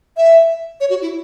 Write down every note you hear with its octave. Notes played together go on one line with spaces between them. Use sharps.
E5
C#5
F#4
E4